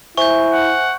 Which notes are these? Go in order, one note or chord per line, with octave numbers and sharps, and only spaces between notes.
E4 C5 E5 G#5 C#6 G6
F#5